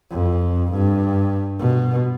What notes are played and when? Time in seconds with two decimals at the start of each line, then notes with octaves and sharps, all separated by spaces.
0.11 F2
0.72 G2
1.59 B2